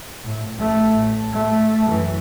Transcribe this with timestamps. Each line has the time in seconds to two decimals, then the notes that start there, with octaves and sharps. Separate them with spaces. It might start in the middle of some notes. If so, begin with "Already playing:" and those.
0.24 A2
0.56 A1 A3
0.94 A2
1.33 A3
1.88 F#2 E3